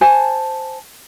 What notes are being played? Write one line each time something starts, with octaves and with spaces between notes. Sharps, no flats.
C5 G#5 A5